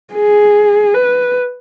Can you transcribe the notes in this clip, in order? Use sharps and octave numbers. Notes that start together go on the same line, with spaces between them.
G#4
B4